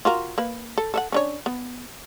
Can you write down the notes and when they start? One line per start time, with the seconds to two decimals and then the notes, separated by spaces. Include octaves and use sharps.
0.05 F4 F#4 A#4
0.38 A#3 B4
0.78 A4
0.94 A4 E5 F#5
1.12 C#4 D4 C#5
1.46 B3